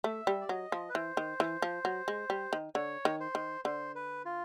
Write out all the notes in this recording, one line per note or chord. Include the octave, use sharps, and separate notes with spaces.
A3 E5
G3
D5
F#3 D#5
F3
B4
E3 C5
D#3
E3
F3
F#3
G#3
G3
D#3
D3 C#5
D#3
C5
D#3
D3 C5
B4
F4